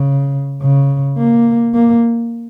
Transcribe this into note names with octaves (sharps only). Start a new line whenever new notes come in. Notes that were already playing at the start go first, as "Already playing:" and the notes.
Already playing: C#3
C#3
A#3
A#3